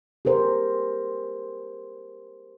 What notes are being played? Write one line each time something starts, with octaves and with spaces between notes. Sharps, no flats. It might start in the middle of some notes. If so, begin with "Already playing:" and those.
G4 G#4 A#4 C5